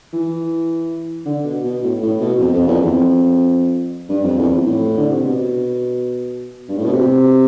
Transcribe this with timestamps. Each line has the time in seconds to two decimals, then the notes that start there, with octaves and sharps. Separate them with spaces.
0.13 E3
1.26 D3
1.44 B2
1.64 B2
1.83 A2
2.02 A2
2.21 B2
2.40 F2
2.53 F2
2.67 E2
2.82 F2
4.09 G2
4.23 F2
4.38 E2
4.52 F2
4.66 A2
4.97 D3
5.10 C3
5.24 B2
6.69 G2
6.77 A2
6.85 B2
6.93 C3